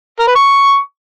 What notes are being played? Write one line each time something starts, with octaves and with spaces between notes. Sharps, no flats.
A#4
B4
C#6